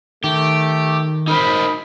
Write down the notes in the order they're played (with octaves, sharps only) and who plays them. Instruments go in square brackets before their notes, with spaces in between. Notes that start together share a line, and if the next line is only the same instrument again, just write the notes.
[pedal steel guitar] D#3 [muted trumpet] A3 [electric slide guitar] G4
[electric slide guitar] D#4 A#4 C5 [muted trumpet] B5